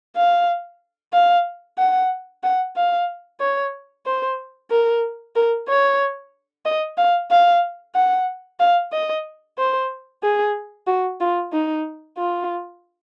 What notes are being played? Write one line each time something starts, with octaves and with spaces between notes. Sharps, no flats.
F5
F5
F#5
F#5
F5
C#5
C5
A#4
A#4
C#5
D#5
F5
F5
F#5
F5
D#5
C5
G#4
F#4
F4
D#4
F4